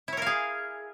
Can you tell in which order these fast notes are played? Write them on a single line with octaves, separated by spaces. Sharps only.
E4 C#5 A#4 F5 G#4